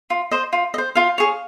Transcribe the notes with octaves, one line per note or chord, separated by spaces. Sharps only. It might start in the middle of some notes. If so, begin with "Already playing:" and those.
F4
C5 D#5
F4
D#5
C5
F4 F5
G#4 C#5